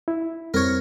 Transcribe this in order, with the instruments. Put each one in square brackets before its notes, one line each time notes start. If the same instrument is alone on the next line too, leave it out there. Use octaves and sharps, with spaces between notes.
[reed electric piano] E4
[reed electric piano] F2 G3 C4 [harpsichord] A#4 C#5